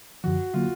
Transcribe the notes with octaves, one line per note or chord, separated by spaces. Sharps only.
F#2 D3 F3 F#4
D3 F#3 A#3 F4